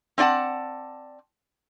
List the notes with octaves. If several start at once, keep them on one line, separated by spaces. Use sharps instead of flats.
C4 D4 D5 F#5 A5